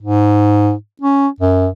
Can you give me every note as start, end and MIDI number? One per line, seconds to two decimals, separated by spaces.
0.03 0.73 44
1.02 1.28 61
1.40 1.68 42